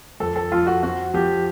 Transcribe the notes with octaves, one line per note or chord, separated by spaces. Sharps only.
F2 A4
A4
F2 F4
F#4
C4 F#4
F3 G4